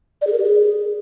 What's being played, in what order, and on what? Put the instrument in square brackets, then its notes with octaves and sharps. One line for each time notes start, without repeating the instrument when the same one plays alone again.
[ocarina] D5
G#4
A#4
G4
G#4